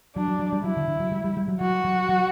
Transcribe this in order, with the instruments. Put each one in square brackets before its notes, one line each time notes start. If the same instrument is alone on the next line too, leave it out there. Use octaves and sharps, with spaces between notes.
[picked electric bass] F#3 [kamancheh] D4
[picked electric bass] F#3
F#3
G3
[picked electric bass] F#3 [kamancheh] E4
[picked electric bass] D3
D3
F#3
G3
G3
G3
F#3
[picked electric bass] F#3 [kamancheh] F#4
[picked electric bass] F#3
F#3